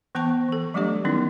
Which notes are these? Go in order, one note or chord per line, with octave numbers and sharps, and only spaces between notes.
E3 B3 C5 G5 A5 C#6
E3 A4
F#3 G3 A3 D4 G4 D#5
D#3 B3 C#4 D#4 E4